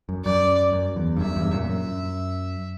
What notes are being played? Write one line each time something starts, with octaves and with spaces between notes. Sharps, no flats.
F#2
F#2 D5
F#2
E2
G2
F#2 E5
E2 G2
F#2 A#2
F#2 E5